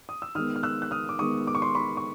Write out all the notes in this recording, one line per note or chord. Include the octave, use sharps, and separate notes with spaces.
D#6
E6
D#3 G#3 B3 D#6 F6
F6
E6 F#6
F#6
D#6 F6
D6
D#3 G#3 B3 C#6 D#6
D6
C#6
C6 D6
B5 C#6
C#6